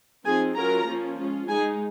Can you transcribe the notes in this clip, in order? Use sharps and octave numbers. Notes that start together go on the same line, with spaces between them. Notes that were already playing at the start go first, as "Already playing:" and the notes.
F3 C4 D#4 G#4 G#5
F#3 C#4 F4 A#4 A#5
F3 A#3 C#4 F4
G#3 C#4 F4
G#3 D#4 G#4 G#5